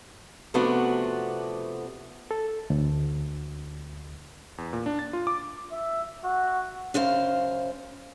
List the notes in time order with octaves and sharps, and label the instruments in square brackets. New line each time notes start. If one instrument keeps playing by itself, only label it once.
[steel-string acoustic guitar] C3 F3 A3 B3 D4 F#4
[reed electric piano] A4
D2
[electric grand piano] E2
A#2
D4
A6
F4
D6
[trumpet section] E5
F#4
[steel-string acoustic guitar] F#2 C#3 C5 F5